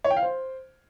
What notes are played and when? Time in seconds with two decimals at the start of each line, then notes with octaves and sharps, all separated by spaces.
0.04 C#5
0.11 G5
0.17 F5
0.23 C5